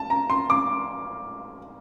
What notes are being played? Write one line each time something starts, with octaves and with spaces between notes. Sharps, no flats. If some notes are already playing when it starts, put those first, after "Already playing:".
Already playing: A5
A#5
C6
D6